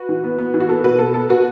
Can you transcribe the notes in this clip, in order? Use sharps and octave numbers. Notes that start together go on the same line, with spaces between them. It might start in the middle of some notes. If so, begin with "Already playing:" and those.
Already playing: F#4 B4
E3
B3
B3
E3
F#4
B3 A4
B2 F#4 B4
B2 A4
B3 A4
B3 F#4 B4